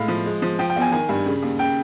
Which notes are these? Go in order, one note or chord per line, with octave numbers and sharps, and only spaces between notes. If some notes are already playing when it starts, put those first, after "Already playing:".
Already playing: A2 G#3 F5
F3
G#3
F3
F3 G5
G5
E2
G#5
D#3 G#5
G2
C#3
D#2
C#3 G5